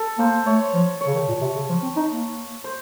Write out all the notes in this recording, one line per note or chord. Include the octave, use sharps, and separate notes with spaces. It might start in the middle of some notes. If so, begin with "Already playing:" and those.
Already playing: A4
A#3 C5
A3 C#5
F3
C#5
C#3
D#3
A#2
C3
C#3
F3
C4
D#4
A#3
C5